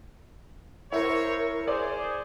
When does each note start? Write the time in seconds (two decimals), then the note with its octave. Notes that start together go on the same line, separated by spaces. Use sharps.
0.92 E4 A#4 C5 C#5
1.68 G#4 C5 D5